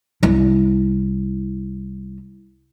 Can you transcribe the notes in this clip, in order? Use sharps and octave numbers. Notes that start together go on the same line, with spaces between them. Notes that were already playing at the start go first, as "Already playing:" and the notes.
C2 E4